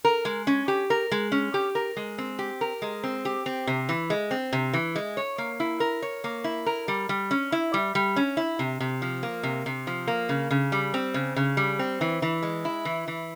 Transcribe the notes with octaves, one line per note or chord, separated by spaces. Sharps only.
A#4
G#3
C#4
G4
A#4
G#3
C#4
G4
A#4
G#3
C4
G4
A#4
G#3
C4
G4
C4
C3
E3
G#3
C4
C3
E3
G#3
C#5
A#3
E4
A#4
C#5
A#3
E4
A#4
G3
G3
C#4
E4
G3
G3
C#4
E4
C3
C3
F3
A#3
C3
C3
F3
A#3
C#3
C#3
G3
C4
C#3
C#3
G3
C4
E3
E3
G#3
E4
E3
E3